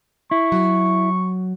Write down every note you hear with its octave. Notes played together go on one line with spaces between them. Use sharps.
E4 C#6
F#3